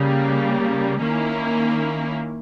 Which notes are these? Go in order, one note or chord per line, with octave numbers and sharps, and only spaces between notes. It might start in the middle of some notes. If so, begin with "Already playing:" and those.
Already playing: C#3 G3 A#3
D#3 A#3 C#4 E4